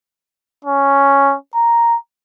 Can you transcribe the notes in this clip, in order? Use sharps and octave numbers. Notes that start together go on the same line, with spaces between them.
C#4
A#5